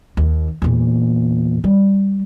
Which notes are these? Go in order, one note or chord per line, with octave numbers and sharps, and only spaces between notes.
D#2
E2 A#2
G3